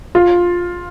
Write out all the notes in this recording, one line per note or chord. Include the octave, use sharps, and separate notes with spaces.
F4